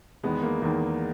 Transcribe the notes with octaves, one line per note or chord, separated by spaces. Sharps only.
E2 D#3 G#3 B3
A#3
E2 D#3